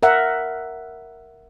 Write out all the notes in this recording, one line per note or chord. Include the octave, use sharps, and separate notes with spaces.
A#4 E5 F#5